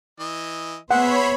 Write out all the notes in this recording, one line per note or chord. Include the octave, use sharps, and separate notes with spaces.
E3 D#5
B3 G#4 C5 C#5 E5 F#5 B5